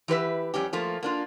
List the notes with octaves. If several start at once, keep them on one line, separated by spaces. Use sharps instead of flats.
E3 G4 B4 E5
F2 G3 C#4 G4
F3 A3 A#3 F4
A#3 D4 F4